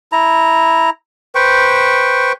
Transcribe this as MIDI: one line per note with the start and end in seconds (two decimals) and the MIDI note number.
0.12 0.90 64
0.12 0.90 82
1.35 2.32 71
1.35 2.32 72
1.35 2.32 79
1.35 2.32 85